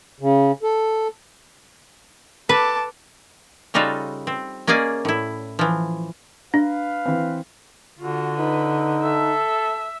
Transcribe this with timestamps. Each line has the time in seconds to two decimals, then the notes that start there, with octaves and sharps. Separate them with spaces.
0.20 C#3
0.63 A4
2.49 A4 B4 A5 D6
3.74 C#3 G3 D#4 F4 F#4 A4
4.27 C4
4.67 A#3 C#4 G#4 D5 D#5
5.05 A2 E4
5.59 E3 F3
6.54 D4 B4 F5
7.06 E3 C4
7.98 D3 F4 F#4
8.39 D#4 B4
9.02 A4 E5